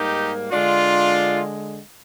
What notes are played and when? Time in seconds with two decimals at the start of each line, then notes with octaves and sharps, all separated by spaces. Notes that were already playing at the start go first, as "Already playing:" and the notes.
Already playing: G#2 G3 A#3 D#4 G4
0.52 D3 G#3 D4 F4